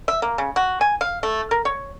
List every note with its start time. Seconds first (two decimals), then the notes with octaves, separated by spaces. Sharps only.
0.08 E5
0.22 A#3
0.38 C#3
0.56 F#4
0.81 G#5
1.01 F5
1.23 A3
1.51 A#4
1.65 C#5